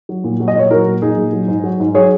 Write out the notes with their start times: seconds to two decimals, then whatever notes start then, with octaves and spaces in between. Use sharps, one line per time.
0.09 F#3
0.24 A#2
0.40 F#3
0.48 D#5
0.56 A#2 C#5
0.71 F#3 F#4 A#4
0.87 A#2
1.02 F#3 D#4 G#4
1.17 A#2
1.33 F#3
1.48 G#2
1.64 F#3
1.80 G#2
1.94 F#3 G#4 C#5